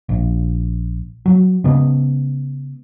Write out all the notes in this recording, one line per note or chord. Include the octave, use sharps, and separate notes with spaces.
A#1
F#3
C#3 G#3 B3